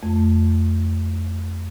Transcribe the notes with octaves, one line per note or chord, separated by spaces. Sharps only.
F2 A3